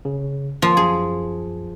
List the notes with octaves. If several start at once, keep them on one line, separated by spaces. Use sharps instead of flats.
C#3
F3 A#3
F#2 G#4